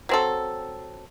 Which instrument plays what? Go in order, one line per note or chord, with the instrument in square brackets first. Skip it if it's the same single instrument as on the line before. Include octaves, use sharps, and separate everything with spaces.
[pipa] F#3 C4 A4